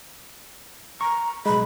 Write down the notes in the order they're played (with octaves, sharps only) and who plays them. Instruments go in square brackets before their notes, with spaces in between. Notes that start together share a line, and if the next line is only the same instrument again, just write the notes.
[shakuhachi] A#5 [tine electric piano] C#6
[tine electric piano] B1 G#3 [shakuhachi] B5